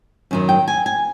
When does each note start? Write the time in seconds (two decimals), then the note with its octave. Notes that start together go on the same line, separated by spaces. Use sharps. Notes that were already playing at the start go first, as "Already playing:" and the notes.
0.31 F#2 D#3 F#3
0.49 G5
0.68 G#5
0.86 G#5